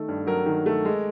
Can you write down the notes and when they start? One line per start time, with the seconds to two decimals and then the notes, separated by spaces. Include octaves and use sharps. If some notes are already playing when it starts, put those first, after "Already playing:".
Already playing: D#3 A3
0.08 G2
0.26 F#3 A#4
0.46 D#3
0.66 A3
0.85 G#3